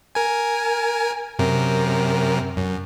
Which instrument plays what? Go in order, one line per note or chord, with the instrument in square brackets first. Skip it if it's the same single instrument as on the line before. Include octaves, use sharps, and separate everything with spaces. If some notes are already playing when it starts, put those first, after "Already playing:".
[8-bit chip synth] A#4 G#5
F#2 C3 A#4
F#2